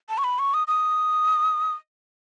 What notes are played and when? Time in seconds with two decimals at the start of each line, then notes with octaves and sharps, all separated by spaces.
0.09 A5
0.18 C#6
0.24 B5
0.39 C#6
0.54 D#6
0.67 D#6